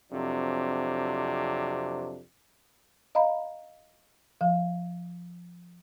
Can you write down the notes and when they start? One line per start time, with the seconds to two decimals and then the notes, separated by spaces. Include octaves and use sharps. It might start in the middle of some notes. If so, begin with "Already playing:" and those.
0.13 F2 C3 F#3 D4
3.15 D#5 F5 A#5 B5
4.41 F3 F5